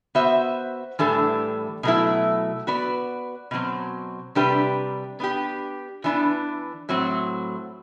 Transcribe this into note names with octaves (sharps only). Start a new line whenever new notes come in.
B3 F#4 C5 E5
A2 E3 G3 D4 A4
B2 F#3 A3 E4
B3 F#4 B4 D5
B2 F#3 C4
C3 G3 D4 G4 B4
B3 D4 G4
E3 B3 D4
A2 F#3 C4